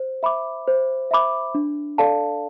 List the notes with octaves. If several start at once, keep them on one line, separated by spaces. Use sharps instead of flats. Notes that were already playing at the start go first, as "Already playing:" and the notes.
Already playing: C5
E5 B5 D6
C5
E5 B5 D6
D4
A4 D5 F5 A5